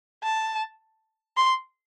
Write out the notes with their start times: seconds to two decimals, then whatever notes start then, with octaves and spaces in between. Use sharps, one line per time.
0.23 A5
1.37 C6